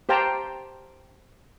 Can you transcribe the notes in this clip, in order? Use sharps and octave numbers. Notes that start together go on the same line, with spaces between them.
G4 C5 F5 G5 A5 A#5